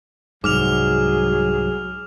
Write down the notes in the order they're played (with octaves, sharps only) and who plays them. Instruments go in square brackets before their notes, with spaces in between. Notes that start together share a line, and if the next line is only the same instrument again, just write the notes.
[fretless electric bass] C2 G#2 [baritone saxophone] F#3 [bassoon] G#4 [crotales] D6 F6 F7